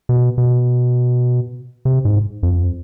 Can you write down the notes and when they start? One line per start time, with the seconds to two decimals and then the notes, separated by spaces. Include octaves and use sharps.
0.09 B2
0.38 B2
1.85 C3
2.05 G#2
2.43 F2